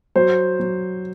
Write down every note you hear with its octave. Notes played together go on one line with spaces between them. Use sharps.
F#3 C5
F#3